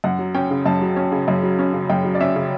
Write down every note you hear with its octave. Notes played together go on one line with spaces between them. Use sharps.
F#2 F#5
F#3
C#4 G5
C#3
F#2 A5
F#3
C#4
C#3
F#2
F#3
C#4
C#3
F#2 G5
F#3
D5
C#4 E5
C#3